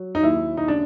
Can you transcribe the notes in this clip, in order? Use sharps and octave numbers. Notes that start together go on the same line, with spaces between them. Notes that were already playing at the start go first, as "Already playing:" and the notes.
Already playing: F#3
D#4
D#2 E4
D#4
C#3 D4